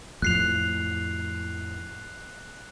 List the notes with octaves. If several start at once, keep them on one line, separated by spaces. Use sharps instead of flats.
F2 A2 F3 F#6 C7 F7